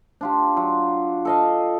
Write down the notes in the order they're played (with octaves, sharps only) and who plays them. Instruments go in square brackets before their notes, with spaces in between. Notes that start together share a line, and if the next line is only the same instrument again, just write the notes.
[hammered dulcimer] D4 F4 G4
F#3 F4
A4 D#5 F5